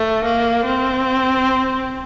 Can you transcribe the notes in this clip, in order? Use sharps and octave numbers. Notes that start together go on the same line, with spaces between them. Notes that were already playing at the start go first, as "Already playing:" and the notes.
Already playing: A3
A#3
C4